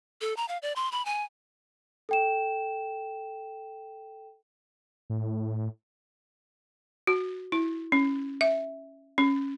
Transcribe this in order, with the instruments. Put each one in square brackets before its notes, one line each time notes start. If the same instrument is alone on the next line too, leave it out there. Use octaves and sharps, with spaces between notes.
[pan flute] A4
A#5
F5
D5
C6
B5
G#5
[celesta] A4 G5 E7
[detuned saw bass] A2
[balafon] F#4
E4
C#4
E5
C#4